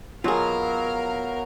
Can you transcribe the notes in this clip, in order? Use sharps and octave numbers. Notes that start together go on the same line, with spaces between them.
B2 F#3 F4 G#4 A#4 F5